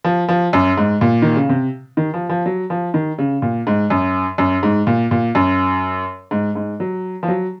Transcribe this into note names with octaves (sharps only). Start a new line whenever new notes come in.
F3
F3
F#2
G#2
A#2
D#3
C#3
C3
D#3
F3
F3
F#3
F3
D#3
C#3
A#2
G#2
F#2
F#2
G#2
A#2
A#2
F#2
G#2
G#2
F#3
F3
F#3